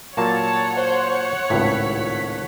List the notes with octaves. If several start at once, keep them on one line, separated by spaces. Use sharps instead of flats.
A#2 F#3 A#3 C#5 F#5 A5
C5
G#1 C#2 A2 B6